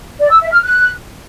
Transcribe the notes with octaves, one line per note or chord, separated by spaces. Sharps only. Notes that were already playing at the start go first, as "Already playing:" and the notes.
D5
E6
E5
F6
F#6